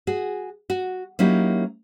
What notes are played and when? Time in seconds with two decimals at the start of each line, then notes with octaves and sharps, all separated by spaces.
0.07 F#4 G#4
0.70 F#4
1.19 F#3 A#3 C#4 D#4 E4 G4